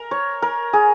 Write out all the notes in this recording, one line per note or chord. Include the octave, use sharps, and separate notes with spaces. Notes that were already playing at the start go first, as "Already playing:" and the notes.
Already playing: A#4
C#5
A#4
G#4